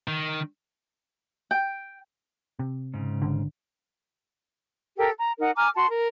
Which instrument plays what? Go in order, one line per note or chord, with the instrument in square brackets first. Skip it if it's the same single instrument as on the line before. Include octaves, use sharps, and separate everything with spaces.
[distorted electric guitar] D#3
[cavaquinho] G5
[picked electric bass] C3
[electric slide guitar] G#2 C#3
[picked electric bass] G#1 D3
[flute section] G4 A4 A#4 G5
A#5
D#4 A#4 F#5
G#5 A#5 D6 F6
F#4 A5 C6
A#4